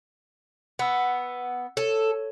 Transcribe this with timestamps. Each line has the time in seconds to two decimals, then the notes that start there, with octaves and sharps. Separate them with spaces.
0.79 B3 F#5 E6
1.77 A4 C#5